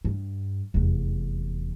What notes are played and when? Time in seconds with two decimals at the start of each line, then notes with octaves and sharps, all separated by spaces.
0.05 G2
0.74 F1 E2